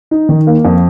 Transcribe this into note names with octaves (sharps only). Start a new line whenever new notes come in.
D#4
D#3
A#3
F2